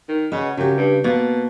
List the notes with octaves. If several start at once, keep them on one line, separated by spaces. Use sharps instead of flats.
D#3
C#3 F#4 B4 D#5
F#2 C#3 G4
G2
B2 A#3 A5